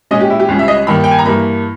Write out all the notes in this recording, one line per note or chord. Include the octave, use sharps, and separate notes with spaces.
A#2 G#3 C#4 D#5
G4
E4
G4
C#2 C#3 G3 C#4
E5
D#5
G2 D#3 A#3 B5
G5
G#5
A#5
G2 E3 A#3 B5